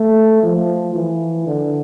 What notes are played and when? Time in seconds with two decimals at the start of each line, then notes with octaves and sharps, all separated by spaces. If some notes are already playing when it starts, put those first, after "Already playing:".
Already playing: A3
0.43 F3
0.95 E3
1.47 D3